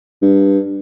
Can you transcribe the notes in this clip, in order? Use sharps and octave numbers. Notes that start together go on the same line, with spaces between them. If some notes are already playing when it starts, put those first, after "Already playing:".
G2